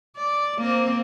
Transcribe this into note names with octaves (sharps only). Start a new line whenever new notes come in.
D5
A#3 C4